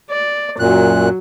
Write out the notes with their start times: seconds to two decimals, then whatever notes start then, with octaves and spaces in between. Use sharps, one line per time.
0.10 D5
0.59 F#2 A#2 F#3 F#6